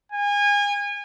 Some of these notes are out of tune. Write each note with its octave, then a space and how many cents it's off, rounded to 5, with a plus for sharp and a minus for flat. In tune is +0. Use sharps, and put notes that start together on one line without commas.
G#5 -30